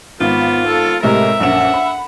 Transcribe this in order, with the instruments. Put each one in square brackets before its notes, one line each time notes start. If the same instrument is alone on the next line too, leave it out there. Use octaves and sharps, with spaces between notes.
[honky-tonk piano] G#1 [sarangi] B3 [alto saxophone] F4
[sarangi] A4
[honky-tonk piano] A2 C3 G#3 [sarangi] A#4 [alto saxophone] E5
[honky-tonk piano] A#1 F#2 E7 [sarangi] F#5
[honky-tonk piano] B5